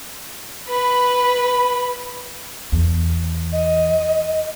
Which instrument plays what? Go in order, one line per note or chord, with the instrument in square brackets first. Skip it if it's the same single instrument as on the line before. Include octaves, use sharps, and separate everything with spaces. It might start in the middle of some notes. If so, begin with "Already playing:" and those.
[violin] B4 B5
[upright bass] E2
[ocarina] D#5